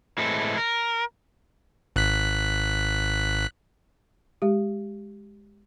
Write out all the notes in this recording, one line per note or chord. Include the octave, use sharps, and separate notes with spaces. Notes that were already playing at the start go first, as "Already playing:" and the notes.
A2 E3 G#3 C4 E4 A4
A#4
G#1 F#6 B6
G#3 G4